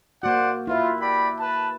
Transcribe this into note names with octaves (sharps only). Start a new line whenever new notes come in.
A#3 F#4 C5 D5 F#5
E4 F4 B4 E5
G4 D5 B5
B4 A5